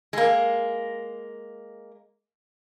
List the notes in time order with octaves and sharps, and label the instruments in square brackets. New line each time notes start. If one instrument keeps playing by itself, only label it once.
[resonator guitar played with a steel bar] G#3 A#3